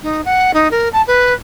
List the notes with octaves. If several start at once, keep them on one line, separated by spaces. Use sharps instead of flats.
D#4
F#5
D#4
A#4
A5
B4